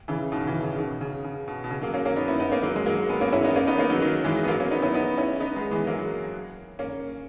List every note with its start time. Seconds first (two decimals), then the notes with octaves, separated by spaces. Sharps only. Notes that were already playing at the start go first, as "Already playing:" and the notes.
0.08 C#3 E3
0.32 B2 D#3
0.47 C#3 E3
0.63 C#3
0.79 B2 D#3
1.01 C#3
1.24 C#3
1.48 B2
1.64 B2
1.71 C#3
1.82 F#3 A#3
1.94 A#3 C#4
2.05 A#3 C#4
2.16 B3 D#4
2.28 C#4 E4
2.40 B3 D#4
2.51 A#3 C#4
2.62 F#3 A#3
2.76 G#3
2.86 F#3 A#3
3.09 G#3 B3
3.21 A#3 C#4
3.32 C#4 E4
3.44 B3 D#4
3.55 A#3 C#4
3.67 B3 D#4
3.79 A#3 C#4
3.90 D#3 F#3
4.02 D#3 F#3
4.24 E3 G#3
4.44 B3
4.48 F#3 A#3
4.60 A#3 C#4
4.71 B3 D#4
4.82 C#4 E4
4.94 B3 D#4
5.17 C#4 E4
5.40 B3 D#4
5.56 G#3 B3
5.71 E3 G#3
5.87 F#3 A#3
6.79 A#3 C#4